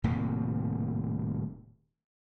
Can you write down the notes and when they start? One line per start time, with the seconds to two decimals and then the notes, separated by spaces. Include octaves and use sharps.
0.04 D#1 A2 C3 A#3